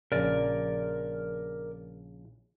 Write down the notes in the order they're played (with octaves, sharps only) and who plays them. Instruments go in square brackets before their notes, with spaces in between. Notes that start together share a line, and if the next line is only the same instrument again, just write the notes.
[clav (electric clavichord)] A#1 C#3 [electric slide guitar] A#4 D5